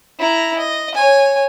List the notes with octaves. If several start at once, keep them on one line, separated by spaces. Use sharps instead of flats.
E4 A#5
D#5
C#5 G#5